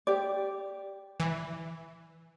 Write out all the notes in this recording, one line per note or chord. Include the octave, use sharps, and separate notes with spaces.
G4 D5
E3